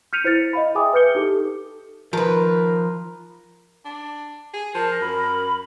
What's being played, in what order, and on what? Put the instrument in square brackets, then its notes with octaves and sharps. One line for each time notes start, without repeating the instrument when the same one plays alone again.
[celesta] F6 G6 B6 C#7 D#7 F7
E4 C5 F6 A6 C#7
D#5 F5 B5
G#4 E5 G5 G#5 D6 D#6
B4 F6 G6 C#7 G7
D#4 G4 A4 D6
[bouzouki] D#3 B4 [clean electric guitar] F3 [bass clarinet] A#4
[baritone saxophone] D4
G#4
[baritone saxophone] F3 [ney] A#4 [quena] A5
[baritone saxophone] F#2 [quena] B5